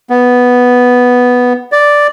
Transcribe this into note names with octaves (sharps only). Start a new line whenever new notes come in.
B3
D5